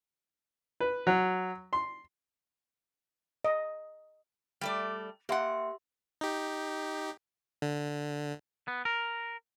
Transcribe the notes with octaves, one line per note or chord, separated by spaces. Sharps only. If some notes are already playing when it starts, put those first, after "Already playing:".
B4
F#3
C6
D#5
G3 A3 D5
A#3 G4 E5 F#5 C6
D#4 G4
D3
B3
A#4